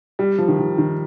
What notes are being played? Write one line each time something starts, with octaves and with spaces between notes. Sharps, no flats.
G3
F3
D#3
D#3
D#3